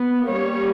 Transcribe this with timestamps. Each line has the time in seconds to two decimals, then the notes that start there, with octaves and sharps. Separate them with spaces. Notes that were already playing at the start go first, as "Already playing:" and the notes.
Already playing: B3
0.28 G3 A#3 C#4 C#5